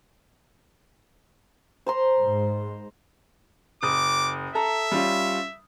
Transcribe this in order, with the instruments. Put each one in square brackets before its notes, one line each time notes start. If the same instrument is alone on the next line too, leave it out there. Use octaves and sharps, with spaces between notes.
[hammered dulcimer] C5 A#5 C6
[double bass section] G#2
[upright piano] F#1 D#6 [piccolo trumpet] D6
[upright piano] A4 A#5 [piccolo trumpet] E5
[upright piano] G3 C#4 F4